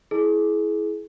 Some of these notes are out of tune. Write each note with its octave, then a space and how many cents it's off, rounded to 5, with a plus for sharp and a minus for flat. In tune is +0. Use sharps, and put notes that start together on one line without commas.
E4 +0 G#4 +30